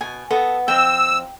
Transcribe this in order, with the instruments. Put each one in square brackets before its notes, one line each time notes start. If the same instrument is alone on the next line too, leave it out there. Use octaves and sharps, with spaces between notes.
[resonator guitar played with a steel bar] B2 [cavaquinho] G#5
[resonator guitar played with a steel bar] B3 [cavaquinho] A4 D#5
[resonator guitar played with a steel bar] F2 C4 [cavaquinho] G5 [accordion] E6